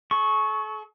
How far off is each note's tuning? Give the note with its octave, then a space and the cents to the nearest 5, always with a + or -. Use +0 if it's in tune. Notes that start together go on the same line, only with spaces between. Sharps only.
A4 -45 C#6 -5